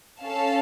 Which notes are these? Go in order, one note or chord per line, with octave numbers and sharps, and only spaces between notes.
C#4 A4 F5 A5